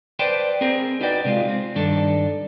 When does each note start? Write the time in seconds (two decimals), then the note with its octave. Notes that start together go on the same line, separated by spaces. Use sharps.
0.19 B4 C5 D5 G5 A5 C6
0.61 C4 G#4 A#4
1.01 D#4 F#4 B4 D5 G5
1.25 C3 G#3 F4
1.48 C4
1.75 G2 D#3 D4 A4